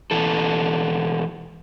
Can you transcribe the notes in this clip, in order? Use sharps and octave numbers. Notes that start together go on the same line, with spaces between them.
B2 E3 A4